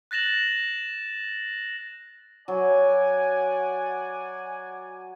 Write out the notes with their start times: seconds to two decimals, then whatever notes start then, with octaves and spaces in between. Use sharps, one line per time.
0.11 F#6 A6 A#6 E7 F#7
2.48 F#3 D5 F#5 G#5